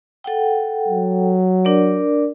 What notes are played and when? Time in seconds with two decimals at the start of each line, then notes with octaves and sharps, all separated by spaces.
0.24 A4 F#5 G5
0.88 F#3
1.65 D4 A#4 D5